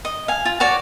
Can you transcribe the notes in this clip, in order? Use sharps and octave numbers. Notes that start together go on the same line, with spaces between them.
D#5
F5 G#5
F4
F#4 C#5 D5